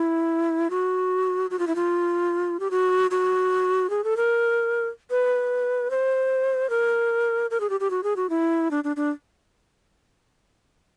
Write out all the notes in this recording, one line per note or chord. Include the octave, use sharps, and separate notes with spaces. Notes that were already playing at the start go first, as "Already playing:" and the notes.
Already playing: E4
F#4
F#4
F4
E4
F4
G4
F#4
F#4
G#4
A4
A#4
B4
C5
A#4
A#4
G#4
G4
G4
F#4
G#4
F#4
E4
D4
D4
D4